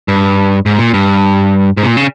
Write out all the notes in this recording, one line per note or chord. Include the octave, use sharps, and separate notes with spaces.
G2
G#2
A#2
G2
G#2
C3
A#2
C#3